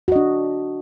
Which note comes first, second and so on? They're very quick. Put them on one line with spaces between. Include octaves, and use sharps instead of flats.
F#4 D#5 D4